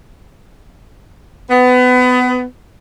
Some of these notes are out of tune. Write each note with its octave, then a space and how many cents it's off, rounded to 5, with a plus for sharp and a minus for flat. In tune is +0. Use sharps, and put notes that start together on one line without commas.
B3 +25